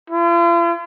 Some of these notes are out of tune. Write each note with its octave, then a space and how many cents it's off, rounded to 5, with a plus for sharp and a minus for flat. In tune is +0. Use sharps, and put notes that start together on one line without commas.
F4 -45